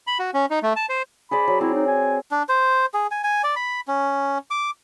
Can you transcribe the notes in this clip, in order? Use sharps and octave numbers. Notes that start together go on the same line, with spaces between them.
B5
F#4
C#4
D#4
A3
A5
C5
G#4 C5 D5 B5
F#3
C4 E4
D#4
G#5
D4
C5
G#4
G#5
G#5
D5
B5
C#4
D6